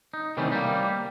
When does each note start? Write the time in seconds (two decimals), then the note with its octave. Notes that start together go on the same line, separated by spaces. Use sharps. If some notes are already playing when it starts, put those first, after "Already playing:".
0.14 D#4
0.37 C3 D#3 E3 G3 A3 C#4
0.52 G3 A#3